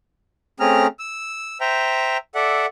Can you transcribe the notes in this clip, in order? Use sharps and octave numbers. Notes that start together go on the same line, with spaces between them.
A3 C4 C#4 G#4 A#5 F6
E6
C5 E5 G5 A#5
A4 D5 E5 F#5